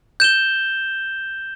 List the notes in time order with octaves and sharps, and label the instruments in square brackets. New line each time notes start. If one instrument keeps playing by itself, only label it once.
[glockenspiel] G6 E7 G7